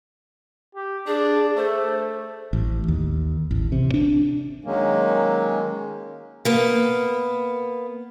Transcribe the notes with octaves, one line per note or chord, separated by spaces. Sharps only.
G4
D4 G#4
A3 C5
A1
D#2
A1
C3
D4
D#3 F#3 G#3 A#3 C#4
A#3 B3